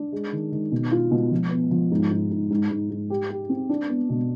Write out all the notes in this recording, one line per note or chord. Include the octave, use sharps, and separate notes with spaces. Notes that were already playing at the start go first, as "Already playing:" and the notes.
Already playing: D4
G#3
D#3
D#3
B2
F4
B2
F3
B3
F3
G#2
G#2
G#2
G#2
G#2
G#2
G4
G4
C4
D4
B3
B2